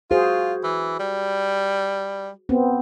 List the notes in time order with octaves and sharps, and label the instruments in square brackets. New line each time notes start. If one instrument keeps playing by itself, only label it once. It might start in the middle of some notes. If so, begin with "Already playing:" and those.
[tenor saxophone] F4 [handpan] F#4 G#4 C5
[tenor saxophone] E3
G3
[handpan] B3 C4